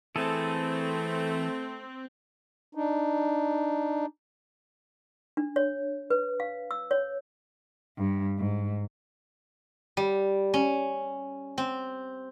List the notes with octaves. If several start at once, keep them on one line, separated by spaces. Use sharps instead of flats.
E3 A3 C4 G#4 A4
D4 D#4
D4
C#5
B4
F5
E6
C#5
G2
G#2
G3
C#4
C4